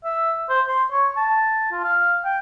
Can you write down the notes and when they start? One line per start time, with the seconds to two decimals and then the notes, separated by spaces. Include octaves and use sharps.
0.04 E5
0.49 C5
0.69 C6
0.92 C#5
1.17 A5
1.72 F4
1.84 F5
2.25 G5